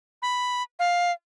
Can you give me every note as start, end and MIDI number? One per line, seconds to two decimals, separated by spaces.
0.22 0.63 83
0.79 1.12 77